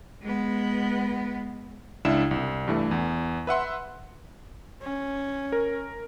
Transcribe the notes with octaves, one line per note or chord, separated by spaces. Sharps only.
G#3 B3
C#2 D4 E4 E7
C2
G2 E3 A3
E2
B4 E5 F#5 C6
C#4
A#4